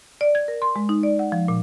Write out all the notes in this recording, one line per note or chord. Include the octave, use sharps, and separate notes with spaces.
D5
G#6
A#4
C6
G#3
D#4
D5
F#5
F3
A#2